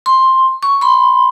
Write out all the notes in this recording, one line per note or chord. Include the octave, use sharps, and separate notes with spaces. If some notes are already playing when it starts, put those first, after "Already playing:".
C6
C#6
B5 C6